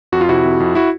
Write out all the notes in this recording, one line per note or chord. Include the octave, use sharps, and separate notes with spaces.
F2 F#4
F4
C3 E4 F#4
F2
F2
E4 F#4